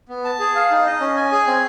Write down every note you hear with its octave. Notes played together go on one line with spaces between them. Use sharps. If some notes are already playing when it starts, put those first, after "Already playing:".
B3
A5
G#4
F5
D#4
D#5
C#4
G#5
G#4
C4